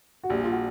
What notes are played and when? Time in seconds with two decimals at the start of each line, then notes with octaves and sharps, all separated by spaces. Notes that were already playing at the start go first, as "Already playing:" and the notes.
0.23 F#4
0.29 A#1 A#2 G3 G4
0.44 F4
0.51 F#4